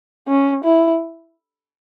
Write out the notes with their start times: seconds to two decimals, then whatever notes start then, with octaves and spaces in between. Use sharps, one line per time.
0.28 C#4
0.64 E4